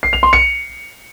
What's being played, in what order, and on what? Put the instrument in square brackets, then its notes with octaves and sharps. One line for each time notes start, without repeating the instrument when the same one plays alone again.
[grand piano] C7
F7
C6
C#7